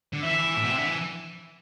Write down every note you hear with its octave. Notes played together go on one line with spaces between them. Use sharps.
D3
E3 E5
A2
B2
C3
D3
E3